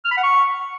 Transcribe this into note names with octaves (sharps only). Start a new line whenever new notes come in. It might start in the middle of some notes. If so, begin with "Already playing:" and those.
F6
B5
F#5
C#6